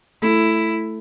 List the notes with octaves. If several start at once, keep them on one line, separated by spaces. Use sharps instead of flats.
A3 E4